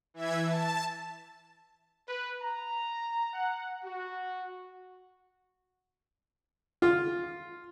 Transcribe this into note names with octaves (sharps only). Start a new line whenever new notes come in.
E3 E5 G#6
A5
B4
A#5
F#5
F#4
F4